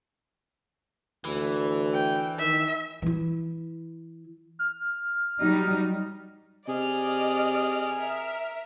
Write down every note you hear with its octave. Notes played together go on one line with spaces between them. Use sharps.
D2 E3
G5
D#3 E5
E3 E4
F6
F#3 G3 D#4
C3 G#4 D5 D#5 F6
A#4 E5 F6